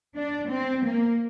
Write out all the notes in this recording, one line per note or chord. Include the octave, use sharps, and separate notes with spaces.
D4
C4
A#3